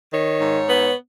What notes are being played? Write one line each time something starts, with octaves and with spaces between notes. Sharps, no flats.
D#3 C#5
G#2
B3